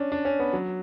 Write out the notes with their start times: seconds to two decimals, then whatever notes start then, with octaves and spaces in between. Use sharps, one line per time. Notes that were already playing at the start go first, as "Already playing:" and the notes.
Already playing: C#4 D4
0.12 D4
0.25 C#4
0.40 B3
0.53 F#3